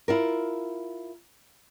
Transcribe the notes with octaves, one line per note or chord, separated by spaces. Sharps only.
E4 F4 A#4